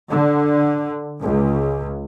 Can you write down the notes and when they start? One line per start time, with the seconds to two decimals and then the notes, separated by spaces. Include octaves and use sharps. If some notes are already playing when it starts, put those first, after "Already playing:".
0.11 D3
1.21 C#2